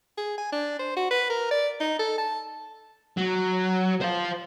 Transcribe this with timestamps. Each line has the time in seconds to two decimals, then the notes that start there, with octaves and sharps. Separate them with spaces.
0.18 G#4
0.38 G#5
0.52 D4
0.79 C5
0.96 F#4
1.11 B4
1.30 A#4
1.51 D5
1.80 D#4
1.99 A4
2.18 A5
3.17 F#3
4.02 C5 F5